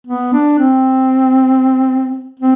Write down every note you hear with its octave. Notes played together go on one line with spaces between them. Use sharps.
B3
D4
C4
C4